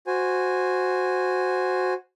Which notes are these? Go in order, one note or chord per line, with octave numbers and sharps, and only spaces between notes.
F#4 C5 G#5